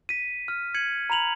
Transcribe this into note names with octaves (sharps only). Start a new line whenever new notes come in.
B6 D#7
F6
G#6 C#7 D#7 F#7
A#5 B5 F7 F#7